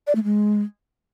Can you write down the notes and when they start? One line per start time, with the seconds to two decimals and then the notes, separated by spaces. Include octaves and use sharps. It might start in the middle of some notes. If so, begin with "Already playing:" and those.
0.07 D5
0.15 A3
0.24 G#3